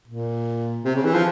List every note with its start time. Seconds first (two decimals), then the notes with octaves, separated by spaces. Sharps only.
0.08 A#2
0.85 C3
0.96 C#3
1.04 E3
1.14 F3